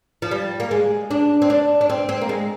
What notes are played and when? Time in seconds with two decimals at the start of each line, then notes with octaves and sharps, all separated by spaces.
0.22 F3
0.31 G3
0.60 A#3
0.71 G#3
1.11 D4
1.42 C4
1.50 D4
1.81 D4
1.90 C4
2.09 C4
2.21 A#3
2.29 G#3